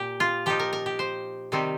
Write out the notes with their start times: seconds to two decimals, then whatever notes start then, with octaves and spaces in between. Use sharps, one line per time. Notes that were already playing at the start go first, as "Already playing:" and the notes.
Already playing: A#2 G4
0.20 F4
0.46 F3 D#4 G4
0.59 A#4
0.73 A#4
0.86 G4
0.99 C5
1.52 C3 D#3 G3 C4 D#4